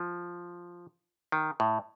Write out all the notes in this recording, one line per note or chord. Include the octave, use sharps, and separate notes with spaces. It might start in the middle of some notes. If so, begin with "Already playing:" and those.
Already playing: F3
D#3
A2